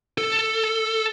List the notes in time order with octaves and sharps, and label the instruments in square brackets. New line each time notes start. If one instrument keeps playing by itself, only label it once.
[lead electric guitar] A4